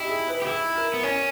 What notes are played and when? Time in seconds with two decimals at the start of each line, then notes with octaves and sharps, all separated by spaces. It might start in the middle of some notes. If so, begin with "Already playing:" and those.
Already playing: D#4 E4 G4
0.09 G#4
0.28 B4
0.42 G4
0.47 E4 G#4
0.75 A#4
0.93 B3
1.03 C#4 C#5